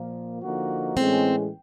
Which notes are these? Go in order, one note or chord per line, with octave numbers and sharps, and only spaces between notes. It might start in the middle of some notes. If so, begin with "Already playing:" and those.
Already playing: A#2 F3 A#3
D3 F3 A#3 D#4 F#4
A2 E3 G#3 C4 C#4